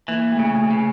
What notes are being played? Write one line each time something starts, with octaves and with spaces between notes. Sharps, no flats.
E3 A#3
A3
C#3
A3
C#3